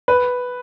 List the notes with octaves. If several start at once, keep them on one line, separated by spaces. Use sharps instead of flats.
B4